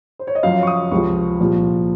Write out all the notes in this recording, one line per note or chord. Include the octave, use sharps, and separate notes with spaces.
C5
C#5
D#5
F#2 F3 F5
C#6
D#6
C#2 C3 F3 C#6
C2 A#2 F3